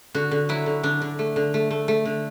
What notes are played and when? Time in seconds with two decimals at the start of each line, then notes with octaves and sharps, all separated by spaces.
0.15 D3 F#4
0.31 D3
0.49 F#3 E4
0.66 D3
0.83 D3 D4
1.02 D3
1.19 A3
1.36 D3
1.54 A3
1.71 A3
1.88 A3
2.05 D3